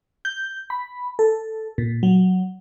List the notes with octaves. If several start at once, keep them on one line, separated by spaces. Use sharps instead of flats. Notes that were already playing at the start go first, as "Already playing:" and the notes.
G6
B5
A4
A#2
F#3